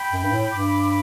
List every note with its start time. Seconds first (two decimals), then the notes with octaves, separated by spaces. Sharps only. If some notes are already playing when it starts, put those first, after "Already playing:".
Already playing: G5 B5
0.12 F#2
0.23 G2
0.32 A2
0.51 G2 B5 D6